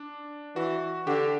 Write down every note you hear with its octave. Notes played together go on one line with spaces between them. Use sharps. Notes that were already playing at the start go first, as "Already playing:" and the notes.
Already playing: D4
E3 F#4
D3 G4